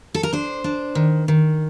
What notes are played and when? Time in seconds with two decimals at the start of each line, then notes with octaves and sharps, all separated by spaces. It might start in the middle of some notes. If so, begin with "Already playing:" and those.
0.14 A4
0.23 A#4
0.33 D4 C5
0.64 D4
0.95 D#3
1.28 D#3